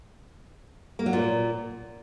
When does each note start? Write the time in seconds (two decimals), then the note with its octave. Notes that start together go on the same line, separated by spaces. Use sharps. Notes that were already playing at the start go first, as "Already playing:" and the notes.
0.99 A#3
1.06 F#3
1.13 A#2